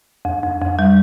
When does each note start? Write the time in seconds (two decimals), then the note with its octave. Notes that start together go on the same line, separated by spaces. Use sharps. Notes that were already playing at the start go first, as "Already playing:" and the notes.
0.25 F2
0.43 F2
0.61 F2
0.79 G3